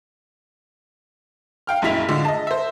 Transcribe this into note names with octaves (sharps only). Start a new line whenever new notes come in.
F5 G5 F6
A#1 F#2 G#3 E4 B6 F7
A2 D3 G#3 F4
D#5 A5
C5 E5